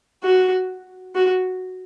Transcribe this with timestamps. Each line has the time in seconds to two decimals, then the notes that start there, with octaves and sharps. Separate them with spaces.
0.23 F#4
1.15 F#4